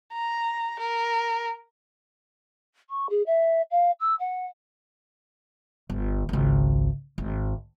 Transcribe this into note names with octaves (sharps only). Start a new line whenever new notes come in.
A#5
A#4
C#6
G#4
E5
F5
E6
F#5
G1
G#1 C#2
G#1